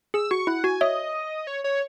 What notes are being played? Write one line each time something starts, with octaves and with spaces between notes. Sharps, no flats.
G#4 E6
F#4 C#6
E4 F#5
F#4 G#5
C#5 D#5 E5
C#5
C#5